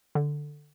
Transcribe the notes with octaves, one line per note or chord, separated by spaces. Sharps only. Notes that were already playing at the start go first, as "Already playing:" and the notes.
D3